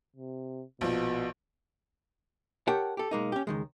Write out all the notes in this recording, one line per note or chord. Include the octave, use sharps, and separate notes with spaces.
C3
A#1 B2 F3
G4 A#4 C#5 F#5 G5 A5
G4 A4
B1 G#3 A#3 D#4
C#4 G4
C#2 D#3 G#3